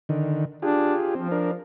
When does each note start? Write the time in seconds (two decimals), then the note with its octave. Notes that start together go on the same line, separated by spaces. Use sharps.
0.09 D3 D#3
0.62 D4 F4 G4 G#4
1.15 F3 C4
1.32 D4 A#4